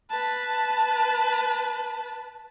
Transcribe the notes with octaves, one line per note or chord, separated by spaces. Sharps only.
B4 A5